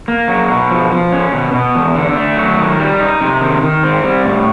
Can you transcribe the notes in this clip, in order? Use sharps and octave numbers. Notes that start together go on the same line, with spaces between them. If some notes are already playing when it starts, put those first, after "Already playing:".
A#3
F#3
B2
F3
F3
C#4
B2
B2
E2
D3
A3
F#3
D#3
G3
D#4
C3
D#3
D#3
C4
G3
A2